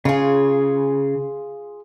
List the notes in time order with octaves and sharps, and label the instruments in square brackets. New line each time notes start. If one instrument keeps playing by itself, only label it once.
[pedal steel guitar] C#3 [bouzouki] F4 G#4